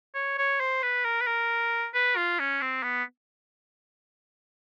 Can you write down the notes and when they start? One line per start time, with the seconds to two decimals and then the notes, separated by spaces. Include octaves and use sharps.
0.15 C#5
0.38 C#5
0.60 C5
0.82 B4
1.05 A#4
1.21 B4
1.27 A#4
1.94 B4
2.16 F4
2.39 C#4
2.62 C4
2.83 B3